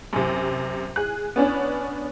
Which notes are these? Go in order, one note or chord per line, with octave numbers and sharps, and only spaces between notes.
F#2 C3
G#4 F#6
B3 C#4 D4 C#5